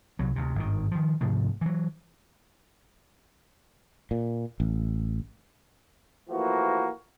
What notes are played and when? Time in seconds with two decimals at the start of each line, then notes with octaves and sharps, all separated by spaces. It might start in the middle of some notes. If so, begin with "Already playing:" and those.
0.19 C2 F#3
0.36 D2 C3
0.55 G#1 G2 D#3
0.91 D#3 F3
1.21 G#2 C3 F3 A3
1.61 E3 F#3
4.11 A#2
4.60 A1
6.29 E3 F3 A3 A#3 F#4